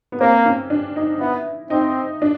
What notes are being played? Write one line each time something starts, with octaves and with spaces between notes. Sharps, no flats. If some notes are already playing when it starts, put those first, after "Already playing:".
B3
A#3 C4
C#4
D4
D#4
B3 E4
C4 D#4
D4